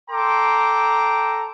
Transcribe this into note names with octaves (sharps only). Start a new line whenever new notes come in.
A4 G5 A#5 C6 D6